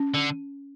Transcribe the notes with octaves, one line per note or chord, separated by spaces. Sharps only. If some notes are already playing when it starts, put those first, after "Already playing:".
Already playing: C#4
D3